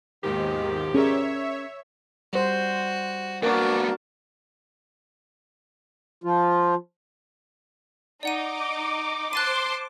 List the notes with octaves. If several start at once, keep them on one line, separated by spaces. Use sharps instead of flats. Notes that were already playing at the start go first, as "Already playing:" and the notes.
D#2 G#2 B2 D#3 F3 G4
C#4 G#4 A#4 C#5 D5 E5
G3 F#4 C5
A#3 B3 D4 F#4 A#4 D5
F3 F4
D#4 D5 F#5 D6 D#7
C5 A5 C6 F#6 A6 D#7